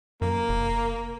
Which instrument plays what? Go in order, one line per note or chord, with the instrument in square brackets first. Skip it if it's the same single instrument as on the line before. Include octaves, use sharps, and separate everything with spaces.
[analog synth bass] F#2 [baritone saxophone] A#3
[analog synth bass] F1